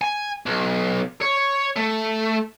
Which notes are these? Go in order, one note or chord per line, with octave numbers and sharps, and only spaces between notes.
G#5
B1
C#5
A3